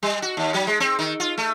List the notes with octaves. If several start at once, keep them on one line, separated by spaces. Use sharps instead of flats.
G3
F#4
D#2
F#3
G#3
C4
D#3
F4
A3